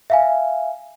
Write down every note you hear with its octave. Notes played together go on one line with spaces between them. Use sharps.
E5 F5 G#5